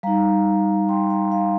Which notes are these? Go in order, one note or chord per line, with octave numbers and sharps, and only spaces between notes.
G3 D#4 F5 A#5
G5 C6
F5 A#5
F5 A#5